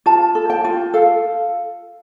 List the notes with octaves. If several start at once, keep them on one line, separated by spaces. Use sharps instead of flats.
F4 A5
A4
G5
F4
A4 F5